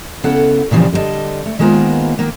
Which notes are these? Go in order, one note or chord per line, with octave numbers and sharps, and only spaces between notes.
C#3 B3 E4 A4 F#5
A#2 C#3 E3 F3 G3 C4
D3 G3 A#4 D#5 A5
A3
D#3 G#3 A#3 B3 F4 C5
D#3 A#3 B3